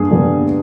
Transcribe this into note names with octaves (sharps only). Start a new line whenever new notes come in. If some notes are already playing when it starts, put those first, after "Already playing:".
Already playing: G2 G#4
D3 G3 B3